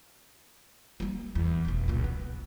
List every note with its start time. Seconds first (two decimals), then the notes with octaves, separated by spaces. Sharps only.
1.00 G3 A#3
1.35 E2
1.65 F1 B2
1.88 C#2 A#2
2.04 B3